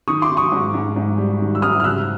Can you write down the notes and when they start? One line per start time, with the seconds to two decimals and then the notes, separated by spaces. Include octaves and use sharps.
0.08 D#3 C#6 D#6
0.22 C6 D6
0.30 D#3
0.37 C#6 D#6
0.52 G#2
0.74 G#2
0.96 G#2
1.18 G3
1.40 D#3
1.55 E6
1.62 G#2 D#6 F6
1.80 F6
1.84 C#3 E6 F#6